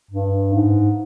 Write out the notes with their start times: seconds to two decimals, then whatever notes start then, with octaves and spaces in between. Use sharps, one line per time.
0.11 G2
0.54 G#2